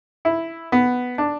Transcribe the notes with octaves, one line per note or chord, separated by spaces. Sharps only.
E4
B3
D4